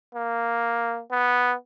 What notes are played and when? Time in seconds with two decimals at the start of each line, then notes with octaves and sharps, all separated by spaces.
0.15 A#3
1.11 B3